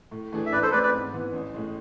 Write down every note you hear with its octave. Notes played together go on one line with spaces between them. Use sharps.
A2
E3 A3 D4 G#4
E5
A1 B4 D5
A4 C5
A2 G#3 C4 G#4 B4 D5
B4 D5
G#2
E3 B3
A1
A2 G#3